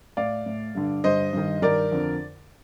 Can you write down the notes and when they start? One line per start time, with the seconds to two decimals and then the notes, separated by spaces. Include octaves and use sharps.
0.17 A2 D5 F5
0.46 A2
0.75 G2 D3
1.04 G2 D3 C5 D#5
1.33 G2 D#3
1.62 G2 D#3 A#4 D5
1.91 F2 D3